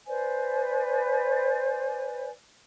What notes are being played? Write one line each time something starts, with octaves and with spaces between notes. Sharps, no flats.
B4 C5 D5 G#5